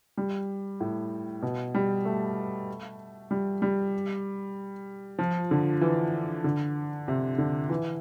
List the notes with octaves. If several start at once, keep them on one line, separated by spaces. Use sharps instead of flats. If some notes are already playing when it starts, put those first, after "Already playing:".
G3
A2
B2
G3
A3
G3
G3
F3
D3
E3
D3
C3
D3
E3